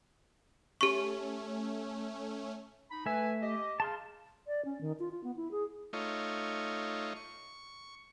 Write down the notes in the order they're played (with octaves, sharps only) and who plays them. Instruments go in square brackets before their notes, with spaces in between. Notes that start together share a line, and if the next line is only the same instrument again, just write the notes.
[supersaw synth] A3 C#4 [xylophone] G4 C#6
[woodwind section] D#4 B5
[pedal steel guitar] A3 E5 [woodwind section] B4 G#5
[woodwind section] G4 D#5
[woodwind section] C#3 [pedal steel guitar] A5 C6 F6
[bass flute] D5
C#4
D#3
F4
F4
B3
E4
G#4
[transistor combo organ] A3 D#4 F4 C#5
C#6